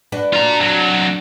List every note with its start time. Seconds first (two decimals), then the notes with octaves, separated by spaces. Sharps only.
0.12 D4 F#4 B4
0.33 F4 A#5
0.61 C2 F#3